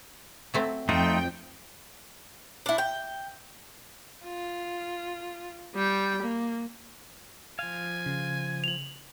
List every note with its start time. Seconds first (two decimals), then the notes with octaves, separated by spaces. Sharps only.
0.54 F#3 A3 C4
0.89 F2 A3 D#4 F4 F#4 G5
2.66 D4 E4
2.78 G5
4.24 F4
5.74 G3 G5
6.22 A#3
7.59 F3 F5 G#5
8.06 C#3
8.64 F7 F#7